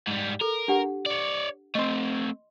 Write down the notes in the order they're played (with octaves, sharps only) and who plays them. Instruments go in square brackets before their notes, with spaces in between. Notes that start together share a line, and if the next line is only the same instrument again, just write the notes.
[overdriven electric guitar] G#2 G3
[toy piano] A4 [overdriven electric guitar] A#4
[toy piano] D4 G4 F#5
[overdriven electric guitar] C#5 D5
[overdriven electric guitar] A3 C4 [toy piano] D#5 C6